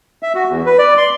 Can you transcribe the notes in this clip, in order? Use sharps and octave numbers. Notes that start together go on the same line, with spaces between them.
E5
F#4
E2
B4
D5
C6